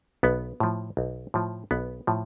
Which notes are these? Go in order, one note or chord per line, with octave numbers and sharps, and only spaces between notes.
B1 B3
A2 F3
B1
A2 F3
B1 B3
A2 F3